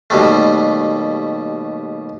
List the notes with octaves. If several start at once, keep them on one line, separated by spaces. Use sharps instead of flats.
D#2 B2 G3 A3